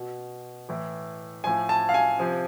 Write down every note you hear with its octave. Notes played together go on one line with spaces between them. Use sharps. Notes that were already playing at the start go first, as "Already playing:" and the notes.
Already playing: B2
A2 E3
A2 F3 G#5
A5
F5
G#5
C3 F3